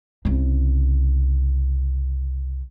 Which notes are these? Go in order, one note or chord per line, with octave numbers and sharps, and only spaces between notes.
C2 C#3